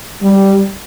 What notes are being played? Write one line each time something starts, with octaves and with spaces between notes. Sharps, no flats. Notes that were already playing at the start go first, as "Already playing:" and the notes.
G3